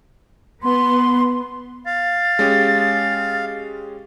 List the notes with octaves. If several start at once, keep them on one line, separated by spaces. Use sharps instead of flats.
B3 C6
F5 A6
G#3 C#4 G4